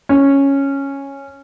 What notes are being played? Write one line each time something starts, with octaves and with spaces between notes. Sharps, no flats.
C#4